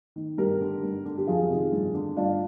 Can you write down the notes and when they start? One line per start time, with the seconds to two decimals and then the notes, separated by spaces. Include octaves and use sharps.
0.16 D#3
0.38 G2 G4 A#4
0.61 D3
0.83 G2
1.05 D3
1.17 G4
1.27 F2 F4 G#4
1.49 C3 D#3
1.72 G2
1.94 D3
2.17 G2 D4 F4